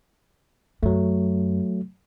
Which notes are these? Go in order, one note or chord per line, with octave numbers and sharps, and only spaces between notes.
F#2 F#3 A3